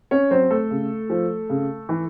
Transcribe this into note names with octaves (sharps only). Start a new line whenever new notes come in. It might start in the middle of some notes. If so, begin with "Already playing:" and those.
C#4 C#5
F#3 C4 C5
A3 A4
C#3
F3
C#3
E3